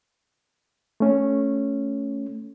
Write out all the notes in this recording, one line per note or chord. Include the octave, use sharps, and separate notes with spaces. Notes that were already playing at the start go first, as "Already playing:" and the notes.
A3 C#4